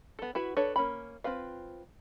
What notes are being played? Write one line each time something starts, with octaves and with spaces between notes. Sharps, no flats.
B3 A4
E4 F#4 B4
D4 A4 B4 C#5
A#3 C#4 B5
C4 F4 B4 F5